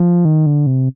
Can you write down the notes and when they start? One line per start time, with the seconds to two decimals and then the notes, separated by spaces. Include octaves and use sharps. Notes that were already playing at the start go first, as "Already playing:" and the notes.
Already playing: F3
0.25 D#3
0.46 D3
0.67 C3